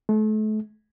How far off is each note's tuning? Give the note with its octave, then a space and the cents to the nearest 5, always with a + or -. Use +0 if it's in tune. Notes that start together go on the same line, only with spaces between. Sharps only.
A3 -35